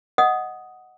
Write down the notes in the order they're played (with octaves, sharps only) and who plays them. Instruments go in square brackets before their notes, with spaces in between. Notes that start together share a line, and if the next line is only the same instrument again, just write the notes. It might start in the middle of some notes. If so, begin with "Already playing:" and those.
[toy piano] D#5 F#5 D#6